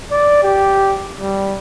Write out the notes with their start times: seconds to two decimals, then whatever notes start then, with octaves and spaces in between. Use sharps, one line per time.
0.11 D5
0.43 G4
1.20 G3